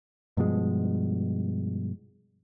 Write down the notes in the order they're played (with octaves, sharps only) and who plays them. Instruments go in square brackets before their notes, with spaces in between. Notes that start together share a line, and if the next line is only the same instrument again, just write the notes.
[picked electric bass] G2 B2 F3 G#3